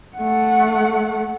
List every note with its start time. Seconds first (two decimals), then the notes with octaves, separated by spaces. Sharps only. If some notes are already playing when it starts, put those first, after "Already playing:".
0.17 A3 F#5